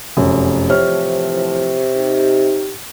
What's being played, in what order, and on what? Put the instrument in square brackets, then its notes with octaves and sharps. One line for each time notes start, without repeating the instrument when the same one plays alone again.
[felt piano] F1 F#2
[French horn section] A2 E3 F3 [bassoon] C3 [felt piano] C#5 F6
[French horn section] D#4 G4